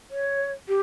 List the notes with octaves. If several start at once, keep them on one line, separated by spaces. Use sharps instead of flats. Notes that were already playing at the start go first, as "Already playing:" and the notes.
C#5
G4